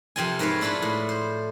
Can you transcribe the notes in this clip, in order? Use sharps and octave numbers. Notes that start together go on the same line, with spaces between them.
F2 C3 C4 F4 G#5
G#2 A#4 B4 C#5 F5
D4 E4 F4 A4 B4
A2
C5